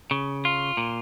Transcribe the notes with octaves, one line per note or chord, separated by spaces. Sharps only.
C#3
F4
A#2